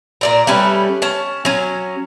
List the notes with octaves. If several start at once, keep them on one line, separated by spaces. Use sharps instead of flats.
A#2 D5 A#5
G3 A3 C#4 B4
C#4 A5
F#3 C#4